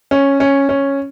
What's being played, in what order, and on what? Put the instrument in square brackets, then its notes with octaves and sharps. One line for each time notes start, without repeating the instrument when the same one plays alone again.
[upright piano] C#4
C#4
C#4